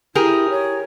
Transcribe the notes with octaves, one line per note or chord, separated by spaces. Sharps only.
E4 G4 G#4 A#4
C#5